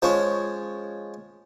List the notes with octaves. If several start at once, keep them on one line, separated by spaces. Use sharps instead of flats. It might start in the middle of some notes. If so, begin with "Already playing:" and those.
F3 G#3 C#4